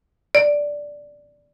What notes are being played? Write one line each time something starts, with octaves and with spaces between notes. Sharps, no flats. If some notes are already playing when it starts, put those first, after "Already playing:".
D5